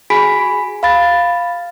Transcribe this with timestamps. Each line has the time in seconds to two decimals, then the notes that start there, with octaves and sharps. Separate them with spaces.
0.10 F#4 G#4 G#5 B5 B6 D7
0.83 F5 B5 A6